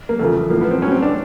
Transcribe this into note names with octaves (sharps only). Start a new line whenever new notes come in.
A#3
E2 C#3 F3 A3
A2 F3 A#3
B3
C4
A2 F#3 C#4
C4
D4